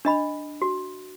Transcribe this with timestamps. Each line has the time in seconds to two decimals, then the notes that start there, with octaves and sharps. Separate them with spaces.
0.05 D4 D#5 B5
0.62 F#4